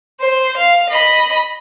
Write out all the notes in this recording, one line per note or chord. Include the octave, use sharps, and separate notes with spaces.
C5
F5
D#5 B5